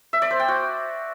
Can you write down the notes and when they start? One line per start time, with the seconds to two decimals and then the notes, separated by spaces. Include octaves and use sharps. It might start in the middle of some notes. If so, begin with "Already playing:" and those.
0.13 E5
0.22 D5
0.31 C5
0.40 G5
0.48 F#4